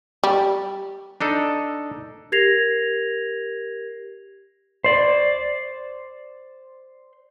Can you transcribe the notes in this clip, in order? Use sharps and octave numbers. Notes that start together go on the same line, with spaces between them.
G3
D4 D#4 A4
G4 A#4 G#6 A#6 C7 F7
C5 D5